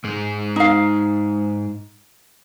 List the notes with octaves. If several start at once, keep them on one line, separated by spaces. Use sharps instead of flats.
G#2 G#3
D#4 F5